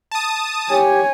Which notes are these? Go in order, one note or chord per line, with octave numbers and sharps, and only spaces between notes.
A5 D#6
G4 C#5 G#5